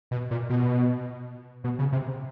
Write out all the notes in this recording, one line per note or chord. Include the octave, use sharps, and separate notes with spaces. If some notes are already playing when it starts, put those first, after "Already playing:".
B2
A#2
B2
B2
C#3
C3